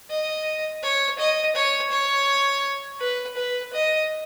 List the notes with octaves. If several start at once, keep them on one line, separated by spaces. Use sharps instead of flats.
D#5
C#5
D#5
C#5
C#5
B4
B4
D#5